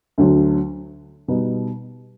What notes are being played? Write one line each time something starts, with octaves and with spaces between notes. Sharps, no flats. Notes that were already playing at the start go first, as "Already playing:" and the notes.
D2 D3 F#3
B2 G3 B3 D#4